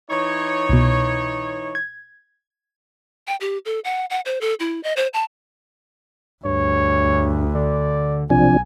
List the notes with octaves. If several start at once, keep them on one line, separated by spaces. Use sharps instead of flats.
E3 D#4 C#5
C2 B2
G#6
G5
G4
A4
F#5
F#5
C5
A4
E4
D#5
C5
A5
D2 G2 C#5
D3 D5
B1 C3 F3 D4 G#5